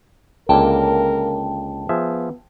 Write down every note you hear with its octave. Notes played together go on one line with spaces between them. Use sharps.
C#2 D3 A#3 A#4 G5 A5
F3 B3 G#4 E5